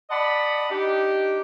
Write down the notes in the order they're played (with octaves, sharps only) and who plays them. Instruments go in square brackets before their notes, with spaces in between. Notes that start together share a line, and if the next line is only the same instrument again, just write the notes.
[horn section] D5 D#5 F#5 A5 B5
D4 D#4 G4